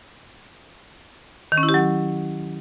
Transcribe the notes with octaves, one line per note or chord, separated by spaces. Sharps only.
D#3
C#4
E4
G4
F#3